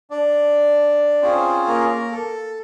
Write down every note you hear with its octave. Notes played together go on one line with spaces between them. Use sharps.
D4 D5
C4 C#4 F4 G#4 C5
A#3 A#4
A4